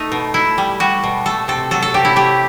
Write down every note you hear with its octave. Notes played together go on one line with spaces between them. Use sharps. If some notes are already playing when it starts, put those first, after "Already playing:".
Already playing: A3 D#4
B2
B2 E4
G3
G3 F#4
B2
A3 A4
C3 A4
F#3 A4
A4
C3 G4
E4
A3 G4